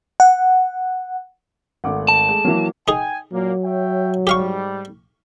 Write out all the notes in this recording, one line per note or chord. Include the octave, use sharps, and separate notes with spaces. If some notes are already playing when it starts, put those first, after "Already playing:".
F#5
G#1 A3 F#5 D6
A5
G#3 A3
E3 F#3 A#3
D#4 G#4 G5 G#5
A#2 F#3 A#3
C#5 E5 G5
G#2 G3 G4 F5 C#6